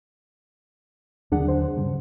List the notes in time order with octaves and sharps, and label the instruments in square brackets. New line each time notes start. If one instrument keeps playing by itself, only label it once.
[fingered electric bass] D#2 D3 F#3 [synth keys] D4 G#4 F#5
[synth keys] C5
[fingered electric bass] G2 C#3 G3